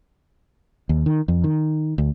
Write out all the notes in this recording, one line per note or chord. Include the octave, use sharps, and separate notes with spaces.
D#2
D#3
F2
D#3
D2